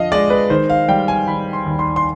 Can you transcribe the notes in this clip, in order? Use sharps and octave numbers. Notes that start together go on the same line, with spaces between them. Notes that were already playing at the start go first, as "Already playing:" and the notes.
Already playing: F2 D3 F3 D#5 F5
G#3 D5
B4
D#3 C5
F5
G3 G5
G#5
D#3 B5
C6
D#2
C6
C6